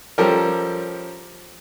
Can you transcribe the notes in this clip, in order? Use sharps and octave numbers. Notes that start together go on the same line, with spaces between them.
F3 G3 C#4 G4 A4 A#4